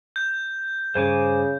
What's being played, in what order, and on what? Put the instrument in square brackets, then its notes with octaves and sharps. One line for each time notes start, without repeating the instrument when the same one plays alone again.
[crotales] G6
[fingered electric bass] G2 [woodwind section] C#3 [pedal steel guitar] C5 G#5 D6